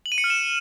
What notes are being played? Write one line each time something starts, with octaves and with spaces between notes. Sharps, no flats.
F#7
D#7
C#7
F6
E7